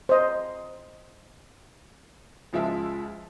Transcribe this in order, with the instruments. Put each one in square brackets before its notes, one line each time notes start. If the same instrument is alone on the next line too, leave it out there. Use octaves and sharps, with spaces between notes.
[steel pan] C5 D#5
[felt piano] C#2 F3 G#3 E5 A5